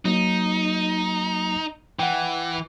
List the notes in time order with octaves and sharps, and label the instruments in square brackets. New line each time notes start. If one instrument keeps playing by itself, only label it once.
[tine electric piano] F#3 A#3 [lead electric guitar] D#4
[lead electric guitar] E3 [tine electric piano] F#5 G5